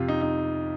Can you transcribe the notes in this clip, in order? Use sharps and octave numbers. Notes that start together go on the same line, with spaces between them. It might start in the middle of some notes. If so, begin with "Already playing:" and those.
Already playing: F2 C3 F4 G4
D#4
D#4